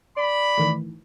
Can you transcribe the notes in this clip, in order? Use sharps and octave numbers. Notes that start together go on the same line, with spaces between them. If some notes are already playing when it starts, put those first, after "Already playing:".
D5 B5
A2 D#3 E3